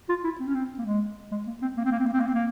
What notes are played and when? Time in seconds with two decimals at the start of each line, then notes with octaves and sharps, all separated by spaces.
0.09 F4
0.24 E4
0.40 C4
0.47 C#4
0.54 C4
0.78 A#3
0.85 G#3
1.31 G#3
1.47 A#3
1.62 C4
1.77 A#3
1.85 C4
1.91 A#3
1.99 C4
2.06 A#3
2.13 C4
2.20 A#3
2.27 C4
2.34 A#3